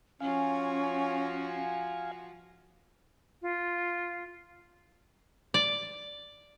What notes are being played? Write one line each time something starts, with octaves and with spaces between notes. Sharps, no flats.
F3 C#4 F4 F#4 F5 G#5
F4
D5